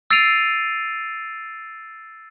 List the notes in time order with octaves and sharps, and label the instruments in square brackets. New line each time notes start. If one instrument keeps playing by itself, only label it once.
[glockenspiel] E6 A6 C7 D7 D#7 F7